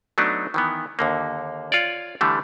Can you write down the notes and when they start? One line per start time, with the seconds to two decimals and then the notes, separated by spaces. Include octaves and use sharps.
0.18 F#3 A3 B3 D4 D#4
0.54 D#3 E3 B3
0.99 D#2 D3 A#3
1.72 F4 C#5 D5
2.21 D3 E3 G3 A3